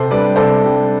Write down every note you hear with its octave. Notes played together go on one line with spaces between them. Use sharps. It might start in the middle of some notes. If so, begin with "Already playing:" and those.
Already playing: C3 A4 C5
G3 D4 B4 D5
C3 A4 C5
G3 D4